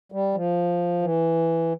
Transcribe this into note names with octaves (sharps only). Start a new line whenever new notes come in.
G3
F3
E3